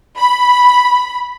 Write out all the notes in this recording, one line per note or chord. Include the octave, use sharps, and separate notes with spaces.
B5